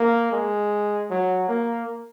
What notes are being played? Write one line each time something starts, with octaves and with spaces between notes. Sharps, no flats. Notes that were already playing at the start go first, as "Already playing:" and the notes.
Already playing: A#3
G#3
F#3
A#3